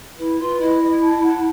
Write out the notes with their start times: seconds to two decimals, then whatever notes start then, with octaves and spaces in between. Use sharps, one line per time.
0.18 E4 B4
0.39 F4 B4
0.60 E4 D#5
0.80 D#5
1.01 A5
1.21 F#5